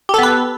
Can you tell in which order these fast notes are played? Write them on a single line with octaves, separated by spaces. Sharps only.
G4 A4 B3 B4